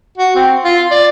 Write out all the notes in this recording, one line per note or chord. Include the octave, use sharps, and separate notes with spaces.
F#4
C4
F4
D5